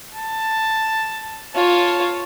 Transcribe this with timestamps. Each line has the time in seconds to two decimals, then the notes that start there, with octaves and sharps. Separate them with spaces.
0.15 A5
1.55 F4 C#5 A5